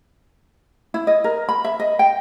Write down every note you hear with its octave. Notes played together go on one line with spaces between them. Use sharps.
E4
D#5
A#4
B5
E5
D#5
G5